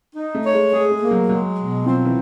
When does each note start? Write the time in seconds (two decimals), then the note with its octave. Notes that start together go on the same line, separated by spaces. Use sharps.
0.16 D#4
0.35 A3
0.44 C#5
0.53 G#3
0.72 G#3 G#4
0.91 G#3
1.01 A#3
1.11 F#3
1.29 F#3 G#3
1.58 B2
1.86 F3 C4
2.05 E3